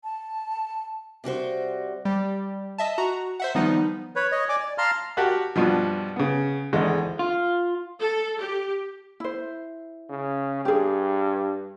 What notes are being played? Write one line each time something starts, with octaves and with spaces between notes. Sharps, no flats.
A5
C3 G3 F#4 C5
G3
D#5 E5 A5
F#4 A#5
C5 E5 F#5
D#3 F3 G3 B3 D#4
B4 C#5
C#5 D#5
D5 G#5 D6
D5
F5 A5 A#5 C6 F6
F#4 G4 A#4 A5 F#6
G2 B2 F3
C#3 B3
G#1 E2 D3 G#3
F4
A4
G4
E4 C5
C#3
G2 G4 G#4